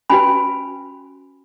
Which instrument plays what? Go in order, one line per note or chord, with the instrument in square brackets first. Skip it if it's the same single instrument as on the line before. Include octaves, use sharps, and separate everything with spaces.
[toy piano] C#4 F#4 B4 G#5 B5